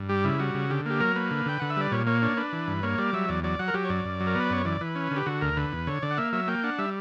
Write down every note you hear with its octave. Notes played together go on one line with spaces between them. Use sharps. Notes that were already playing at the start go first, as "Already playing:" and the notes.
Already playing: G2
G3 G4
C#3 E4
G3 F#4
C#3
D3 G4
A#3 G4
F#3 A#4
A#3 B4
D3
D3 G5
D3 F#5
E5
G3 D5
A#2 C#5
A#3 C#5
D4 C#5
D4 B4
E3
G2
A#3 C#5
G3 D5
F#3 E5
E2 D5
F#3 D5
F#3 F#5
A#4
F#3 G4
C#5
F#2 D5
F#2
F#3
A#4
B3
B4
F#2 C#5
E3 D5
E3 B4
C#4
D3
G4
D3 F#4
D2 A#4
D3 B4
E2
D3 C#5
D3 D5
F#5
A#3 E5
F#3 E5
A#3 G5
D4 F#5
G3 E5